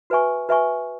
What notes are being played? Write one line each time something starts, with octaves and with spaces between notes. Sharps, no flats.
F#4 B4 E5 G#5 C#6
F#4 B4 E5 G#5 C#6